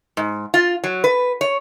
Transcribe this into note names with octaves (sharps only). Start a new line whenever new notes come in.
G#2
F4
F#3
B4
C#5